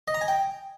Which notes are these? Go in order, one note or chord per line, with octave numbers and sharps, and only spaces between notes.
D#5
A#5
G#5
G5